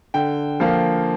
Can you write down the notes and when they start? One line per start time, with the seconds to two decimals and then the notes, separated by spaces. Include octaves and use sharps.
0.14 D3 G5
0.60 F3 A#3